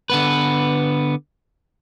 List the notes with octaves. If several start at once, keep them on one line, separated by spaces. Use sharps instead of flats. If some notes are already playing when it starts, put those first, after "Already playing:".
D3 B3 B4